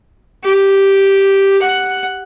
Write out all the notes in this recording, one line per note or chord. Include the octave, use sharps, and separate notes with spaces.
G4
F#5